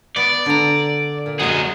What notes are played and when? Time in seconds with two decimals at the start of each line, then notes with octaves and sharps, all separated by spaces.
0.17 B3 D5
0.46 D3 A#5
1.26 A#2
1.39 F#3 G#3 G#4 D#5